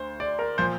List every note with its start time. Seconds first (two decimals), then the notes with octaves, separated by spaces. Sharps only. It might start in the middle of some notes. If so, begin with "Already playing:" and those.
Already playing: D2 C5
0.20 D5
0.39 A#4
0.58 A#2 F3 C5